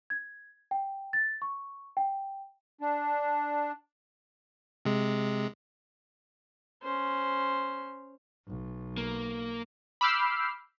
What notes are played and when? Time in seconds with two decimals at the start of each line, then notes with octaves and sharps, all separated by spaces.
0.10 G#6
0.71 G5
1.13 A6
1.42 C#6
1.97 G5
2.81 D4
4.85 C3 G#3
6.83 C#4 C5
8.47 B1
8.98 A#3
10.01 B5 D6 E6 F6 G6 C7